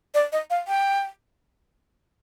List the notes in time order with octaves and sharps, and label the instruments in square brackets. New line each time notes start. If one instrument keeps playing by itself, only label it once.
[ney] D5
D#5
F5
G5